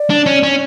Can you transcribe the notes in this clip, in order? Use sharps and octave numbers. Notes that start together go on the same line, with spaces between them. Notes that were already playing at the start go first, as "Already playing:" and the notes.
Already playing: D5
D4
C#4
C#4